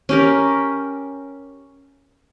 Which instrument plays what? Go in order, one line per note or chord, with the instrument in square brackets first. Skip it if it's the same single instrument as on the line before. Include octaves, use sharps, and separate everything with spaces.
[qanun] C#4 G4 A#4